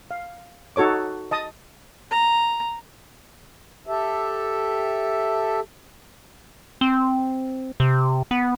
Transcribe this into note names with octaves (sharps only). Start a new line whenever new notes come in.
F5
D#4 F#4 A4 C#5 D6
D#5 A5 D#6
A#5
G4 A4 E5
C4
C3
B3